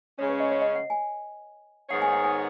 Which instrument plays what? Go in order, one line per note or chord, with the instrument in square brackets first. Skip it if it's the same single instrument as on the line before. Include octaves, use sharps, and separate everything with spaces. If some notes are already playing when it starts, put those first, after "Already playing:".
[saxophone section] C#3 G#3 C#4 [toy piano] C#5
[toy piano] B4
D#5
C#5
D#5
F#5
G#5
[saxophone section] G#2 D#3 B3 G#4 C#5 [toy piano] F#5
[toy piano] G#5
F#5
G#5